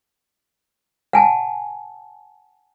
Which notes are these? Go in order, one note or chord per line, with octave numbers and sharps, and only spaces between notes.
F#5 G#5 A5